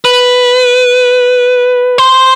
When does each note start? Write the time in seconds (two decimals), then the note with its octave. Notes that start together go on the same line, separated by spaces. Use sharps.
0.05 B4
1.98 C5